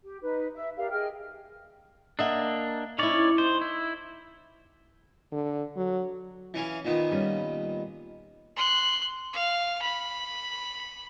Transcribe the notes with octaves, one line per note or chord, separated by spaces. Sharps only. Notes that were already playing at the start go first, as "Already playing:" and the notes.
G4
D#4 B4
E5
G4 A#4 D5 F5
G#4 D#5 G5 F6
A#3 D4 D#5 E5 F#5
C#4 D#4 E4 C#5 D5
D#4 C5
E4
D3
F#3
E3 C#4 F5
A#2 D#3 B3
G3 C#4
C6 F#6
F5
B5